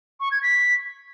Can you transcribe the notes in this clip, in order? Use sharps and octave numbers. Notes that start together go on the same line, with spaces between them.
C#6
G#6
B6